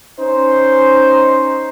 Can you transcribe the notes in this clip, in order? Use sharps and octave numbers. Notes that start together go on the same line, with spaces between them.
C#4 D#4 C5